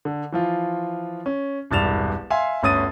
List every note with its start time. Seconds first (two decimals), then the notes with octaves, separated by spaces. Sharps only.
0.05 D3
0.32 E3 F3 F4
1.26 C#4
1.71 E1 C2 G2 A6 E7 F7
2.30 E5 F5 G#5 C6
2.63 G1 D2 C#4 D#6 A6 D#7